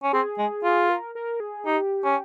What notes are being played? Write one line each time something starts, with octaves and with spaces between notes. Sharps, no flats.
C#4
C4 G#4
G#3
F4
A#4
A#4
G#4
D#4 G4
C#4